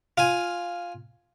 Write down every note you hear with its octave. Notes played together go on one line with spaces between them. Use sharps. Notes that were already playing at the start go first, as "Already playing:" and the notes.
F4 G#5